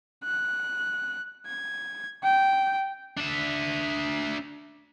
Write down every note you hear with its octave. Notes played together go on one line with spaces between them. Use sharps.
F#6
G#6
G5
D4 E5